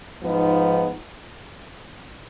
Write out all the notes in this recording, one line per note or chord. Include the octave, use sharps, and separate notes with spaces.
G#2 F3 B3 D#4